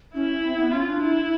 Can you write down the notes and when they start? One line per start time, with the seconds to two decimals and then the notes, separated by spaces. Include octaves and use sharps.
0.15 C#4 E4
0.44 C4
0.58 B3
0.72 C#4 F4
0.86 D4
1.01 E4